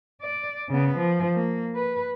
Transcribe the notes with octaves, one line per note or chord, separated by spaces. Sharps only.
D5
C#3 B3
F3
A#3
B4